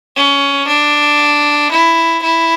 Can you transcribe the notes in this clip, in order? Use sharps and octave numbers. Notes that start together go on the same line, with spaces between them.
C#4
D4
E4
E4